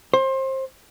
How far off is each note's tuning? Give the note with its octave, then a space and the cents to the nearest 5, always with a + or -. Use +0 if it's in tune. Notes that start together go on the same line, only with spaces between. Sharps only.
C5 +25